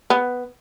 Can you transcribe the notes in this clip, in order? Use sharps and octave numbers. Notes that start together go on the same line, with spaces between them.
B3